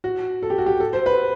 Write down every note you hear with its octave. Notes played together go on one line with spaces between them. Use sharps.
F#4
A4
G4
F#4
G4
A4
C5
B4